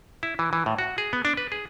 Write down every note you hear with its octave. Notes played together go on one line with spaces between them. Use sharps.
E4
E3
E3
A2
F#4
G#4
B3
D4
B4
G#4